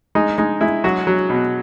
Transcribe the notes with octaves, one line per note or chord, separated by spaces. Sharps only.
G#3 D#4
G#3 D#4
G#3 E4
F#3 F#4
F#3
B2